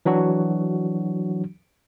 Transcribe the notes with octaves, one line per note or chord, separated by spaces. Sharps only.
E3 F#3 D4 F#4